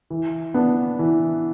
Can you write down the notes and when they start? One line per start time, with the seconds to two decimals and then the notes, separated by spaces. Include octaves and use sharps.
0.10 E3
0.54 B3 D4
0.99 E3